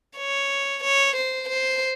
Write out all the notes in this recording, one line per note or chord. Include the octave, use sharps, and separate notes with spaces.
C#5
C#5
C5
C5